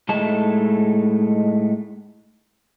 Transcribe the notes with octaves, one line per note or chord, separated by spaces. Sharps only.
A2 G#3 A3 D#4 A5